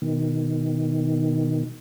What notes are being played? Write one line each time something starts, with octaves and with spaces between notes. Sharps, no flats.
B2 D#3